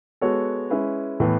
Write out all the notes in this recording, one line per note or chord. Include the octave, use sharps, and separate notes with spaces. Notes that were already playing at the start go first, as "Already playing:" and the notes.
G#3 B3 F#4 A4 C#5
G#3 C#4 E4 B4
A2 E3 B3